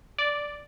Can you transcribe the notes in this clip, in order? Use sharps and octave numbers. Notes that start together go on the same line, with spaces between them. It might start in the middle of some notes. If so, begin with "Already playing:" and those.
D5